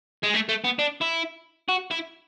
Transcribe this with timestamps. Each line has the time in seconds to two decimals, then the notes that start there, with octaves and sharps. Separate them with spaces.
0.24 G#3
0.34 A3
0.49 A3
0.64 B3
0.79 D4
1.02 E4
1.69 F#4
1.91 E4